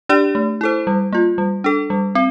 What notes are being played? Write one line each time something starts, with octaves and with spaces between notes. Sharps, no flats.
D4 G4 D5
A3
E4 A4 C5
G3
A#3 F4
G3
D4 A4
G3
C4